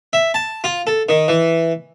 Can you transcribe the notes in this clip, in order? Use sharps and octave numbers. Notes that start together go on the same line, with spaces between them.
E5
A5
F4
A4
D#3
E3